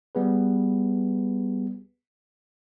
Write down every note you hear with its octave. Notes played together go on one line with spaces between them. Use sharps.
G3 B3 G#4 B4